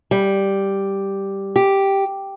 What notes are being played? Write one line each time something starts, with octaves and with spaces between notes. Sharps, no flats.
G3
G4